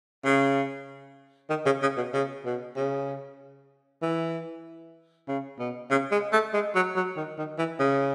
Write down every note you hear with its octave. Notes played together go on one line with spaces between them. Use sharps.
C#3
D#3
C#3
C#3
B2
C#3
B2
C#3
E3
C#3
B2
C#3
G#3
A3
G#3
F#3
F#3
D#3
D#3
E3
C#3